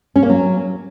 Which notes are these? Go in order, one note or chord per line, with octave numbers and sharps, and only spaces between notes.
C#4
A#3
F#3